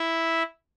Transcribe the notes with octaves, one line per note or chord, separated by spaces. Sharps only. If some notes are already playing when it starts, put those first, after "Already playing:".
Already playing: E4 E5